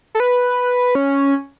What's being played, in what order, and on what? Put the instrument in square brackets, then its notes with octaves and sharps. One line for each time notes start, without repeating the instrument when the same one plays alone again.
[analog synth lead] A4
B4
C#4